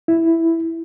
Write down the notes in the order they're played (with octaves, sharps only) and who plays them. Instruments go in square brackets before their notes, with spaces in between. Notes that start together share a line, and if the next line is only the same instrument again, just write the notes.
[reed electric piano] E4